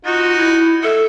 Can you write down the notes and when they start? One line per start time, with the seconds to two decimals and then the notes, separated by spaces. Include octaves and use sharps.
0.05 D#4 F4 F#4
0.37 E4
0.83 A4 E5